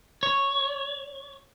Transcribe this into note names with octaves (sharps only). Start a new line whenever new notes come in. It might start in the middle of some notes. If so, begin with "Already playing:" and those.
C#5